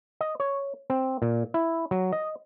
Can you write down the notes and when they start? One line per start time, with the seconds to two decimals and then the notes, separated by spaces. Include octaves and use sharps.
0.21 D#5
0.40 C#5
0.90 C4
1.22 A#2
1.54 E4
1.91 F#3
2.13 D#5